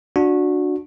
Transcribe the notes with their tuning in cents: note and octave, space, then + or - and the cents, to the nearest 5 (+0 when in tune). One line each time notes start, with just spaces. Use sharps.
D4 +0 F#4 -20